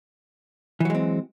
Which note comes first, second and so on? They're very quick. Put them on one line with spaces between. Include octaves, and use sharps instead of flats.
E3 F#3 G#3 C4